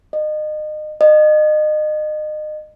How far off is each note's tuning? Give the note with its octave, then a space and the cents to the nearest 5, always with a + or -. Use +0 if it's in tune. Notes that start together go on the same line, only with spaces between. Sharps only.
D#5 -30
D#5 -30